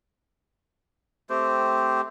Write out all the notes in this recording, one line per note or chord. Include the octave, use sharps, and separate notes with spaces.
A3 C4 G4 C5